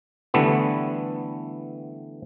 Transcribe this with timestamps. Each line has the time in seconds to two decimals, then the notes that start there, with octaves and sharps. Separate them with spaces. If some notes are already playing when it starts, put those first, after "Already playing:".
0.34 D3 E3 G3 A3 B3 E4